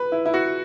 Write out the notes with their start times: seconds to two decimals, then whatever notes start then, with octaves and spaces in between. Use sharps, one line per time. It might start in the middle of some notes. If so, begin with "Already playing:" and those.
Already playing: B4
0.12 E4
0.25 E4
0.34 F#4